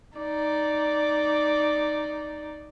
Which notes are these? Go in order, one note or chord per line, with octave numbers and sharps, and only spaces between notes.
D#4 D5